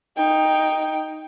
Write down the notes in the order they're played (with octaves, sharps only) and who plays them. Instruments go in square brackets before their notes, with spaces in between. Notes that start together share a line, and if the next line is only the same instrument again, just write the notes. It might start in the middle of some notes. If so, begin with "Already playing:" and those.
[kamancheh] D#4 G5